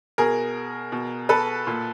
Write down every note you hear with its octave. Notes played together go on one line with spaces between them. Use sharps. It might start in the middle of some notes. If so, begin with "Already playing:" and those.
B2 G#4 A#4
B2
A4 B4
A#2